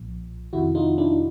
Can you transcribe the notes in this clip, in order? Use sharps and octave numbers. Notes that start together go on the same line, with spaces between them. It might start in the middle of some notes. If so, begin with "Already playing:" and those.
Already playing: B1 A#2 F3
F2 C3 D#3 E4 F#4
D#4 F4
D4 E4